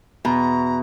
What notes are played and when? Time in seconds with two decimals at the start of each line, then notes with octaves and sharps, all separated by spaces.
0.25 E2 B2 A#5